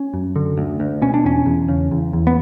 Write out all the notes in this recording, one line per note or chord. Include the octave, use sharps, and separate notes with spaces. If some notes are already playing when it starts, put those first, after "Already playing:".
Already playing: C#4
F#2
D3
D2
D2
B2 C#4
D4
E2 C#4
E2
C#3
E2
E2
B3